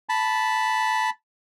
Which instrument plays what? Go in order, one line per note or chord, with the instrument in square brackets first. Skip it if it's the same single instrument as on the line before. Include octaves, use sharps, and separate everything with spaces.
[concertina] A5 B5